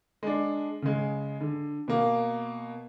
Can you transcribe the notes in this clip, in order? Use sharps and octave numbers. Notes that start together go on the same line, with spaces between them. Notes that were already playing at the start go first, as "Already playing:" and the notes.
G#3 D4
C#3 G#3
D3
B2 A#3